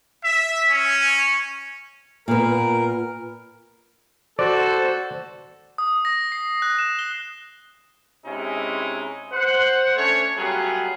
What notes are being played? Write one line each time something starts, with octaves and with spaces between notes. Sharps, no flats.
E5
C#4
A#2 B3 A#4
F#4 A4 C5 D5
D#6
A#6
C7
F#6
E7
G7
C3 G#3 C#4 D#4 E4
C5 F#5
A3 C#4 D4 C#5
F#3 G3 A3 B3 F4 G#4